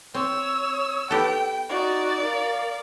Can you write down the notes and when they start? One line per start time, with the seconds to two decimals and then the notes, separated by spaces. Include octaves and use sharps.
0.14 C4 C#5 E6
1.11 B3 G4 A4 G5
1.69 D#4 F#4 D5
2.23 A#4 F5